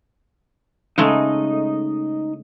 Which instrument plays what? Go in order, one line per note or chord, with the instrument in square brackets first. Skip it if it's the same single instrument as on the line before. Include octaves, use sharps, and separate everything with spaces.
[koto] C#3 G#3 A3 [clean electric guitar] D#4 D#5